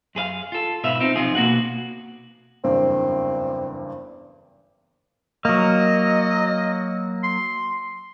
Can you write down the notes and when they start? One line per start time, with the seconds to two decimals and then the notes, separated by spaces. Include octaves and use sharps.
0.15 F#2 G#4 B4 F5
0.52 F4 A4
0.84 G#2 B2 B4 E5 F5
1.00 C4 D#4 F4
1.16 B1 C3 F3 D#4 F4 G#4
1.35 B2 A#3 F#4 F#5
2.64 F#1 E2 G2 C4
5.45 F#3 A#3 D#5
7.23 C6